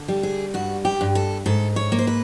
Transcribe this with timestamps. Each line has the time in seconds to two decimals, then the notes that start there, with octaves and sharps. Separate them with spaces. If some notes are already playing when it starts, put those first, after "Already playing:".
Already playing: D3
0.08 G3
0.23 G#4
0.54 G2 F#4
0.85 G4
1.01 G2
1.15 A4
1.46 G#2 A4
1.76 C#5
1.92 A#3
1.99 C5
2.07 B4